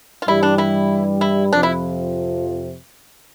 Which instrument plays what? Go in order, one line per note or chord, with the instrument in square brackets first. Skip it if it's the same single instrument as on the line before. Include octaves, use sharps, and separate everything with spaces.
[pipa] F4
[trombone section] G2 E3 G3 [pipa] E4
[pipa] D4
E4
E4
[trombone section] F2 C3 F3 [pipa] D4
[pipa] E4